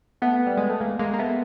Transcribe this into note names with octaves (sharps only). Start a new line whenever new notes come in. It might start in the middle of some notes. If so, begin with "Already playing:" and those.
A3 B3
G3
G#3
A3
G#3 A#3
G#3 A#3
A#3
A3 B3